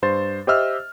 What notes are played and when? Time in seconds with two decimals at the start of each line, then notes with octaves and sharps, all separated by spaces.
0.02 G2 C5 C6 A6
0.47 G4 C5 D#5 E5 E6 F6